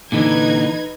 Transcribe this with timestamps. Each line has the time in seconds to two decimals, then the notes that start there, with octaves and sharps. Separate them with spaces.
0.12 A#2 D3 E3 D#4 B4 G#6